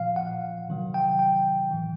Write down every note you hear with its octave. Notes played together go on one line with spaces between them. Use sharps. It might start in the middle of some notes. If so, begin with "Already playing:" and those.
Already playing: A#2 F3 F5
F#5
C3 D#3 F#3
G5
G5
A2 E3